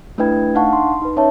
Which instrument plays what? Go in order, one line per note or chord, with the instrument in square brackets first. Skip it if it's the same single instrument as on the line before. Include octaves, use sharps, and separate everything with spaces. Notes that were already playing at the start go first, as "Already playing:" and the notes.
[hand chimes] A3 D4 E4 B4 G5 G#6
A3
D4 D#4 F5 F#5 A5 C#6
C6
D#4 B4
C#4 D#4 C#5 E5 A5